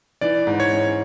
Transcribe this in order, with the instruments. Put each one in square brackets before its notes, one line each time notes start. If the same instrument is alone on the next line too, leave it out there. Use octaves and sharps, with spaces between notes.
[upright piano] E3 [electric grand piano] D5
[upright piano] G#2
[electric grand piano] C#5
[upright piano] C#4